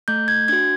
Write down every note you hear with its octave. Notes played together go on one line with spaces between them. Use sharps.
A3 G6
G#6
D4 F#4 G#6